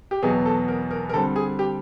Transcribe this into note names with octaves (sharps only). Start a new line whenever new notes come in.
G4
E2 B2 F#3 B3 G#4
A4
A#4
A#4
A#4
D3 G3 C4 A4
G#4
G4